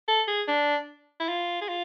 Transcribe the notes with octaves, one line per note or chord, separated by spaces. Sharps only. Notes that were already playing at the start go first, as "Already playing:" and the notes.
A4
G#4
D4
E4
F4
G#4
F4